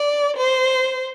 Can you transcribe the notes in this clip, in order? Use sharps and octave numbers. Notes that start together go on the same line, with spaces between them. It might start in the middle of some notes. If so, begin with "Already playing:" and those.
Already playing: D5
C5